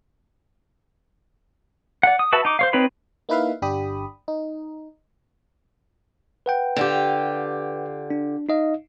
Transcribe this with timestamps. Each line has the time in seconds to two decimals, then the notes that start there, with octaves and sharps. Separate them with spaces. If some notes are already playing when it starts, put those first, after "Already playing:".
2.03 D5 F#5
2.19 D#6
2.33 F#4 B4 E5 A5
2.45 D#4 D6
2.59 C5 C#5 F5
2.73 C4 D#4 B4 C#5 B5
3.29 A#3 D#4 E4 B4 E5 F5
3.62 G1 D4 G4 B5 D#6
4.28 D#4
6.46 B4 F#5 G5
6.76 D3 F4 G4
8.10 D4
8.49 D#4 D#5 F5